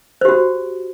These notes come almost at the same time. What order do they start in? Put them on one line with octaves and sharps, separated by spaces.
C5 G4 F#4